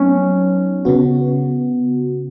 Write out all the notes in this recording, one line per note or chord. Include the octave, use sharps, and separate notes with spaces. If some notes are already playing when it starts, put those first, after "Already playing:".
Already playing: F#3 B3 C#4 D#4
C#3 B3 F#4